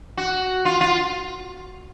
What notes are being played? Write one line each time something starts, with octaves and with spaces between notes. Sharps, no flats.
F#4
F4
F4